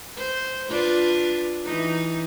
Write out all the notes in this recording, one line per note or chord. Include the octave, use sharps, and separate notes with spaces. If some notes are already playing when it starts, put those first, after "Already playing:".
C5
D4 F4 B4
E3 D#4